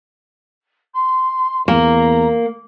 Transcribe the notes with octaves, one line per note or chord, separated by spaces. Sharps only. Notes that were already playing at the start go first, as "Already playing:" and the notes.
C6
E2 A#3 A#5